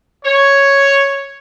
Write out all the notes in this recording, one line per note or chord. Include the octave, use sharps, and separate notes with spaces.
C#5